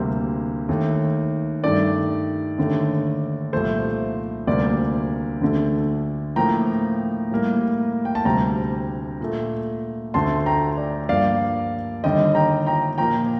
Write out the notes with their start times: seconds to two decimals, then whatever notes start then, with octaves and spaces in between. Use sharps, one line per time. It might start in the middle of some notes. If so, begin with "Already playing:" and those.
Already playing: D2 C3 G3 A#3 C5
0.69 D#2 D#3 A3
1.64 G2 D#3 A3 D5
2.58 D#2 D3 A3
3.53 C2 A#2 F3 A3 C5
4.47 D2 C3 G3 A#3 D5
5.41 D2 D3 A3
6.36 A2 F3 A#3 G5 A#5
7.31 A2 G3 A#3
8.05 G5
8.15 A5
8.25 D2 C3 G3 G5 A#5
9.20 A#2 A3
10.14 D2 D3 A3 A5 C6
10.46 G5 A#5
10.77 D5
11.09 G2 F3 A#3 D5 F5
12.04 D#2 D3 G3 D#5 G5
12.35 G5 A#5
12.66 G5 A#5
12.98 A#2 F3 A#3 G5 A#5